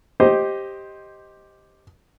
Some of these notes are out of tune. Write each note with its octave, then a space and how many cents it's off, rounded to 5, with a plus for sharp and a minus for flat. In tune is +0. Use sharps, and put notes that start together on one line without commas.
G4 +0 C5 +10 D#5 +5